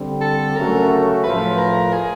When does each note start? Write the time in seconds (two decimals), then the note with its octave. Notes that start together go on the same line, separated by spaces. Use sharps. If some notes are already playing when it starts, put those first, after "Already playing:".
Already playing: D3 G3 C4
0.21 A4
0.56 C#3 F#3 A3 C#4 F#4 A#4
1.24 A2 F3 A3 B4
1.58 A#4
1.93 G#4